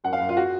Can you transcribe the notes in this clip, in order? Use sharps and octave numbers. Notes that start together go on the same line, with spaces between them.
F#2 F#5
F5
F#2
F4
F#4